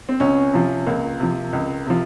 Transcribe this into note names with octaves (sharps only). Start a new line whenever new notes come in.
C4
C#2 C#4
C3 F3
C#2 A#3
C3 F3
C#2
C3 F3